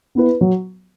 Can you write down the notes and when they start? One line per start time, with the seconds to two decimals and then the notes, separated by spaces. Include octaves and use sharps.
0.15 B3 E4 B4
0.41 F#3